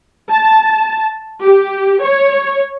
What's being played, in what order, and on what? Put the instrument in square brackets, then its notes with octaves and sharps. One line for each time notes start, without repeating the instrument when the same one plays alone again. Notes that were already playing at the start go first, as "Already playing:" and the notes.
[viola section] A5
G4
C#5